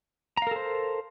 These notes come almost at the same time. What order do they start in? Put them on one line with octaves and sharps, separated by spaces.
A#5 F5 A#4 A4 C5